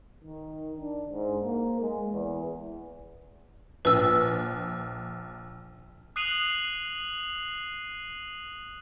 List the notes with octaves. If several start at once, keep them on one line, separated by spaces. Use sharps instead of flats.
D#3
D4
G#2
A#3
G#3
E2
A#1 B4 E6
D#6 F#6 C7 D#7 F7 F#7